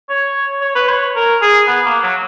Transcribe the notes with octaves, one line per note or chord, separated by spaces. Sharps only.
C#5
C#5
B4
C#5
A#4
G#4
B3
A#3
F#3